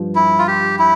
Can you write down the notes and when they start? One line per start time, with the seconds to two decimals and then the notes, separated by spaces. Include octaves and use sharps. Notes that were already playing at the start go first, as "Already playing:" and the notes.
Already playing: G2 F3
0.16 E4
0.39 F4
0.48 G4
0.79 E4